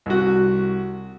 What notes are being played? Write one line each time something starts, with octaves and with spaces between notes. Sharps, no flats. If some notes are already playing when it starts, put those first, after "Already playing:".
C2 F#4